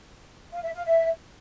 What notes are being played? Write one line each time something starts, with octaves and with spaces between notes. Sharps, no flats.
F5
E5
F5
E5